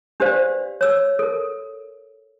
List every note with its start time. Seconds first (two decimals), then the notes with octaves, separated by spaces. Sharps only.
0.20 D4 G4 B4 C5 D5 F5
0.81 C#5 E6
1.19 A4 A#4